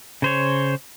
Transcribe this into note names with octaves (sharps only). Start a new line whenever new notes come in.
C#3 C5 C#5